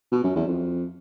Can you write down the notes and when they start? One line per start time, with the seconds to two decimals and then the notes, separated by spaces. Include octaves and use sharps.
0.12 B2
0.24 F#2
0.35 E2
0.47 F2